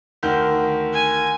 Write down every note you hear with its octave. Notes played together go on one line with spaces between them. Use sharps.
D2 D#3 G6
G#5